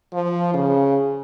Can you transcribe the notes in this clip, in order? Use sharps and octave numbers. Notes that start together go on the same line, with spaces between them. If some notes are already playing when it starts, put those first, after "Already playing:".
F3
C#3